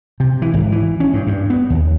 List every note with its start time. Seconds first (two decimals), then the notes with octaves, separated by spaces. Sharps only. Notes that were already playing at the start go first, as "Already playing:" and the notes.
0.20 C3
0.42 E3
0.54 G#1
0.72 E3
1.00 C#4
1.13 G2
1.27 G2
1.50 B3
1.70 D#2